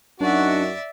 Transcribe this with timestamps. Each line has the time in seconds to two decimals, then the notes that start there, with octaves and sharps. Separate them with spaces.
0.21 F#2 D4 D#4 F#4 D5 E5